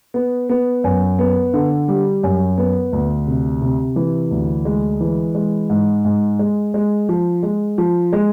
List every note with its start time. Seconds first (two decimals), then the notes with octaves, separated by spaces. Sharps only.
0.14 B3
0.49 B3
0.84 F#2
1.19 B3
1.54 D3
1.88 G3
2.23 F#2
2.58 B3
2.93 D2
3.27 C3
3.61 C3
3.96 E3
4.31 D2
4.65 G#3
5.01 E3
5.35 G#3
5.70 G#2
6.05 G#2
6.39 G#3
6.74 G#3
7.09 F3
7.43 G#3
7.78 F3
8.13 G#3